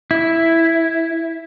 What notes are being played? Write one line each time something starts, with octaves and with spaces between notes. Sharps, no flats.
E4